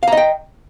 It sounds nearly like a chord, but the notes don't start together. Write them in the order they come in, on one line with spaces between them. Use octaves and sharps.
F5 A#5 D#5 G5